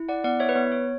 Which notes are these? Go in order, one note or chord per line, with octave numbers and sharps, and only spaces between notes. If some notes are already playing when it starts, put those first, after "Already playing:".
Already playing: E4
D5 F#5
B3 D5 F#5
C#5 E5
B4
B3 C#5
C#5